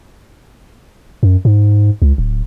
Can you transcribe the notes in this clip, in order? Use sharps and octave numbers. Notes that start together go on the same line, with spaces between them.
F#2
G#2
C#2
D1